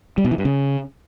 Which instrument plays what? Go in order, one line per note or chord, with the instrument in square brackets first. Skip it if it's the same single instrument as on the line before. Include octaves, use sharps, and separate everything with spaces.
[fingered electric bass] G3
B2
E3
G2
C#3